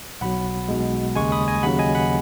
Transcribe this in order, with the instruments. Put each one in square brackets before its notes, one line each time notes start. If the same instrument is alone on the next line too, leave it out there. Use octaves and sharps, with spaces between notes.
[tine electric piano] B1 B2 F#3 F#5 B5
B1 B2 G#3
D#2 C#3 G#3 G#5 C#6
B5 D#6
D#5 G#5
D#2 C#3 F#3 F#5 B5
D#5 G#5
F#5 B5